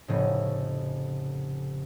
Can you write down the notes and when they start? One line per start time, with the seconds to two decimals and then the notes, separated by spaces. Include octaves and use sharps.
0.08 F1 A2 C#3